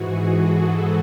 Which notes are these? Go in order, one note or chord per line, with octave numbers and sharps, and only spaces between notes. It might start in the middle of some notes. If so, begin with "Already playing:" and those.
Already playing: G#2 E3 F#4 G#4
A4